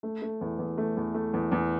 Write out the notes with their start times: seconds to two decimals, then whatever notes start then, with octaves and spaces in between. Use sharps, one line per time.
0.03 A3
0.22 A3
0.41 E2
0.59 E2
0.78 A3
0.97 E2
1.14 A3
1.34 E2
1.52 E2